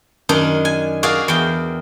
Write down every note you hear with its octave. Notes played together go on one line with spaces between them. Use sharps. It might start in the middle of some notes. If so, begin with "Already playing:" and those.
F#2 D#3 D4 D#4
G#5
F#4 G#4 A#4 D5 F5
E2 G5